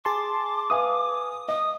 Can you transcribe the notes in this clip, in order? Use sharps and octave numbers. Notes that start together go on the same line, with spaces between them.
G#4 A5 C6 D6
B4 F5 G#5 D#6
D#5 D#6